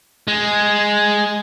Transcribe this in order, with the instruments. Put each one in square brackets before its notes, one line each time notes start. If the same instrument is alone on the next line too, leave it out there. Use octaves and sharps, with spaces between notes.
[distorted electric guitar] G#3